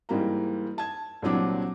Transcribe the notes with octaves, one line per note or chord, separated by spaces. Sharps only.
G#2 E3 G3 A#3 A#5
A5 G#6
C2 A#2 F#3 C4 D4 D6